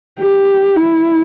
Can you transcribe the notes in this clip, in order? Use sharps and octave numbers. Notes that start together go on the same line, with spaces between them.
G4
E4